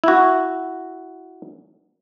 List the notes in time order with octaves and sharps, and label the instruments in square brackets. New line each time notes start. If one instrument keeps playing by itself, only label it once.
[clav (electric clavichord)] E4 F#4